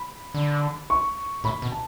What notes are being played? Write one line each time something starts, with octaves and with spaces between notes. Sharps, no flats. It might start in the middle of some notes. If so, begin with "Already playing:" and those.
Already playing: B5
D3
C#6
A2 B5
B2
A5